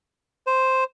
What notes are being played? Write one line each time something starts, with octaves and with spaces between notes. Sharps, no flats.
C5